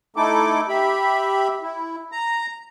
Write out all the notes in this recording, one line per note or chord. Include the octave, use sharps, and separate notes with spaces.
A3 D#4 E4 A4 D6
G4 E5 B5
E4
A#5